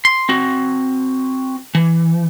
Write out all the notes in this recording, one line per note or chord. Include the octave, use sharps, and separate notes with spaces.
C6
C4 F#4
E3